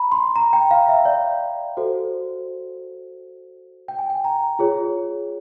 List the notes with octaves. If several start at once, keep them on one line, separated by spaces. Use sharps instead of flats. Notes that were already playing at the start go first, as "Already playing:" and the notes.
Already playing: A#5 B5
C6
A#5
G5
F5
E5
D5
F#4 A4 C5
G5
G#5
G5
A#5
F4 G#4 C#5